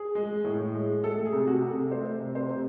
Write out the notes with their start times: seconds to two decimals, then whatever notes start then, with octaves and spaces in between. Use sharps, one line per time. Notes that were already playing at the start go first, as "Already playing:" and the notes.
Already playing: G#4
0.15 G#3
0.45 A2
0.74 G#3
1.03 A3 A4
1.25 G#4
1.33 C3
1.47 F#4
1.62 C3
1.69 A4
1.91 A3 C5
2.21 C3
2.35 C5
2.50 C3